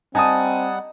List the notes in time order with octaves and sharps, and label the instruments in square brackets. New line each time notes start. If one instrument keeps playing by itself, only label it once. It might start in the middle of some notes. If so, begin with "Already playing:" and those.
[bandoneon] G3 F#5 [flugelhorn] C4 [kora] D#4 [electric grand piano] G#5 A5 D#6